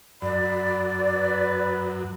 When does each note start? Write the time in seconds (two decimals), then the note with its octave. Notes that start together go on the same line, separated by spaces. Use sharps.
0.22 F#2 D5 B5
1.00 B4